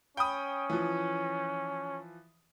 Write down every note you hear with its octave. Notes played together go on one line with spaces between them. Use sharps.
C#4 G5 B5 D#6
E3 F3